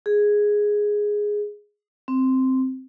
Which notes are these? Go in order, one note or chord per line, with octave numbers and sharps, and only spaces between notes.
G#4
C4